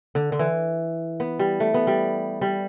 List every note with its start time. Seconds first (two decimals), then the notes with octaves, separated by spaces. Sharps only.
0.15 D3
0.32 D3
0.39 E3
1.20 B3
1.39 G3
1.60 A3
1.74 B3
1.87 G3
2.41 G3